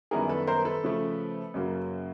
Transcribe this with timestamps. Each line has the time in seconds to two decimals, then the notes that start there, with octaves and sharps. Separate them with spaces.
0.11 F#2 D#3 G3 B3 E4 G#4 A#4
0.29 A4 B4
0.47 A#4 C5
0.65 A4 B4
0.83 C#3 F3 A3
1.54 F#2 C#3 F#3 A#3